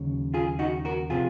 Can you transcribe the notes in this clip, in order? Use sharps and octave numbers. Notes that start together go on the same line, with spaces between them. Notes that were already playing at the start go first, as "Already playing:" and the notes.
Already playing: D#2 C#3 F#3
F4 G#4
D#4 F#4
F#4 A#4
C3 F3 F4 G#4